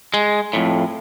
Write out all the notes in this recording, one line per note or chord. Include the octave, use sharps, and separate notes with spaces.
G#3
F2 A2